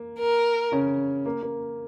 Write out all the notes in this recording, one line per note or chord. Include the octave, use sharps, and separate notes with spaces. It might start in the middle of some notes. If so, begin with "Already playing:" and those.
Already playing: A#3
A#4
C#3 C#4
A#3
A#3